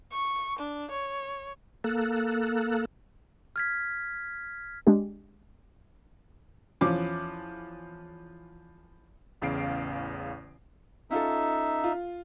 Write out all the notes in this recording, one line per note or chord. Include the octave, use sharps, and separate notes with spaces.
C#6
D4
C#5
A#3 A4 F#6
F6 G#6 B6
G#3 D4 G4
E2 F3 C#4 D6
A1 E2 C#3 F5 C7 D7
C#4 D#4 F4 A4 E5
F4